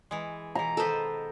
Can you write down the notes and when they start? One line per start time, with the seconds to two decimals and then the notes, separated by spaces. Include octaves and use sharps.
0.11 E3 G#3
0.55 B2 E3 A#5
0.77 D#3 B3 A4 B4 C5